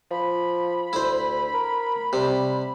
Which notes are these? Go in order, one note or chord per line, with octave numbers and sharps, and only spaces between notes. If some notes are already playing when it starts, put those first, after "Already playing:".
F3 B5
D2 E4 C5
A#4
C3 G3